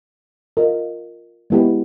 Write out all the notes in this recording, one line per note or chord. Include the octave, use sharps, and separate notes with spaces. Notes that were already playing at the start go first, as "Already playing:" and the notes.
F4 A#4 D#5
G#3 B3 E4 G4 B4